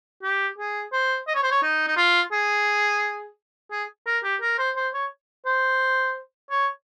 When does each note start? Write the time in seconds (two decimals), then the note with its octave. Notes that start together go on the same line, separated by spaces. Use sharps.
0.23 G4
0.58 G#4
0.92 C5
1.28 D#5
1.35 C#5
1.43 C5
1.51 C#5
1.62 D#4
1.87 D#4
1.97 F4
2.32 G#4
3.71 G#4
4.06 A#4
4.24 G4
4.41 A#4
4.58 C5
4.76 C5
4.94 C#5
5.46 C5
6.51 C#5